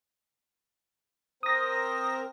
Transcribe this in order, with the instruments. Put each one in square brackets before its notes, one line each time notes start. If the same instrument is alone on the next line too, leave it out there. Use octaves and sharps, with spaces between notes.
[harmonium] C4 A#4 C5 [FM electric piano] D#6 A#6